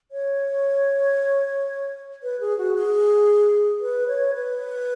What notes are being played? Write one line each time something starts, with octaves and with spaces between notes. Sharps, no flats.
C#5
B4
G#4
F#4
G#4
B4
C#5
B4